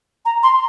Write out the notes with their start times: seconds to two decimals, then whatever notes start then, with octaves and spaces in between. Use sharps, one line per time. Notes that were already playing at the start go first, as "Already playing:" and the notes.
0.25 A#5
0.43 C6